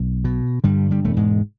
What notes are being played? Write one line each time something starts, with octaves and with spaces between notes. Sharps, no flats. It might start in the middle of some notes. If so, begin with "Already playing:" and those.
Already playing: B1
B2
G2 D3 G3
G2 G3
E1 A3
G#2 G#3